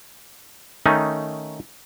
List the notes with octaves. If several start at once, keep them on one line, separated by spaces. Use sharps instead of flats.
D#3 A3 C#4 D#4